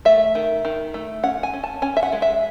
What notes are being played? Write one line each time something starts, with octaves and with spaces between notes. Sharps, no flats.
A3 E5
D#3
D#3
A3
C#4 F#5
G#5
C#4
A5
C#4 G#5
E5
F#5
G#3
E5